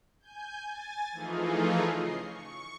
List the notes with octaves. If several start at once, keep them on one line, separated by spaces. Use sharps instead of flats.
G#5 G6
G#5 A6
E3 F3 A3 D#4 F4 G#4
C#3 D#5 C7
C#6